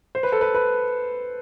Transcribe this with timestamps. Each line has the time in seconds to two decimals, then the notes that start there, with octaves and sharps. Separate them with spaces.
0.15 C5
0.23 B4
0.32 A4
0.41 B4
0.55 B4